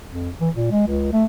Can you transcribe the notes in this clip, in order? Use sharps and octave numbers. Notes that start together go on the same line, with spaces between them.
F2
E3
A#2
G#3
C#2
A3